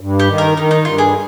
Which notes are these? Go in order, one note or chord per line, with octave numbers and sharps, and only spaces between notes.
G2
G4
D#3
A#4
D#3 D#4
D#4
G2 F4
G#4